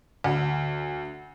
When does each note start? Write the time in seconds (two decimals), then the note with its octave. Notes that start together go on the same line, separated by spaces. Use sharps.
0.24 D2